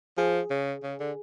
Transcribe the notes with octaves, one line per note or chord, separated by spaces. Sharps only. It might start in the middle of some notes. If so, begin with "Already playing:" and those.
F3 G#4
C#3
C#3
D3